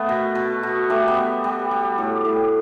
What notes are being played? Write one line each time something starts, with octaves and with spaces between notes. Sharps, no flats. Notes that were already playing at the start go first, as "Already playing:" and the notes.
Already playing: A3 B3
B2
B2
B2
G3 A3
B3
G3
G3
G3
A2
A2